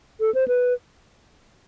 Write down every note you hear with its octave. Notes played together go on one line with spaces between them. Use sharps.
A4
C5
B4